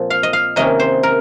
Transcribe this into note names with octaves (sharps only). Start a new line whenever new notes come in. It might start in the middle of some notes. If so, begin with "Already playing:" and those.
Already playing: A#2 F3 C4
F5
D#5
F5
C3 D#3 A#3 C#4 D#5
C5
A#4